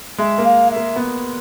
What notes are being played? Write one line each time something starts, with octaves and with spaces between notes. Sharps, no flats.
G#3 E5
A#3
F5
E5
A#3
B3